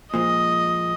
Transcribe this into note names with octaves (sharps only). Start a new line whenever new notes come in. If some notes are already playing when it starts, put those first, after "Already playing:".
A#2 F3 G#3 D#5